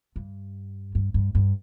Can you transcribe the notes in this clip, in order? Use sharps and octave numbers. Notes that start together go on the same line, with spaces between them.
G2
G2
G2
G2